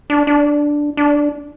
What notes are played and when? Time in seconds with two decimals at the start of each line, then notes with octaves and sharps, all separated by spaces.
0.10 D4
0.27 D4
0.97 D4